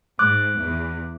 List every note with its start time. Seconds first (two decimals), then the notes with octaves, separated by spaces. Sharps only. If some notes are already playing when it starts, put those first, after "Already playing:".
0.19 G#2 D6 F#6
0.58 E2